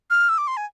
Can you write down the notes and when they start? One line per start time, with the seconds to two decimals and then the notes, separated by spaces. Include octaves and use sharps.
0.10 F6
0.29 E6
0.38 D6
0.48 C6
0.57 G#5